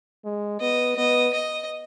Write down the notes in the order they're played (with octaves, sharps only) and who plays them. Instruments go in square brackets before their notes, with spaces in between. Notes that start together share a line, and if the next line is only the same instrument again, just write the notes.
[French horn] G#3
[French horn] B3 [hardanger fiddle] D#5
[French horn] B3 [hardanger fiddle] D#5
[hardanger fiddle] D#5